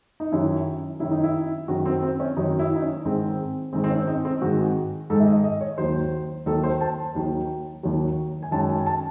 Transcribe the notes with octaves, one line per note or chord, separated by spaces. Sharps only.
D#4
F#2 D#3 F#3 E4
F#2 D#3 F#3 E4
D#4
E4
F#2 D#3 F#3 F#4
C4
C4
C#4
F#2 D#3 F#3 D#4
E4
D#4
C#4
G#2 D#3 G#3 C4
G#2 D#3 G#3 C4
C4
C#4
D#4
C4
G#2 D#3 G#3 F#4
G#2 D#3 G#3 A4
E5
D#5
D#5
C#5
D#2 D#3 F#3 C5
D#2 D#3 F#3 A4
C5
A5
D#2 D#3 F#3
D#2 D#3 F#3
G#5
F#2 D#3 G#3 A5
G#5
A5